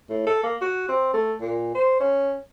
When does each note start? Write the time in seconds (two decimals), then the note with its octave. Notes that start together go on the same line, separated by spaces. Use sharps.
0.09 A2
0.26 A4
0.43 A#3
0.61 F#4
0.88 C4
1.14 A3
1.41 A#2
1.75 C5
2.00 C#4